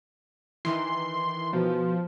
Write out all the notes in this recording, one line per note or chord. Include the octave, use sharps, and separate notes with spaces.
D#3 E3 C6
B2 F3